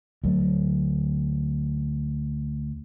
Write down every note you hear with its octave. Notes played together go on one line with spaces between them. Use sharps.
D2 F#3 A3